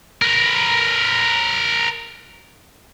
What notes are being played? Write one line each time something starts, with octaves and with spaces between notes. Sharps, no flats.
A#4 B4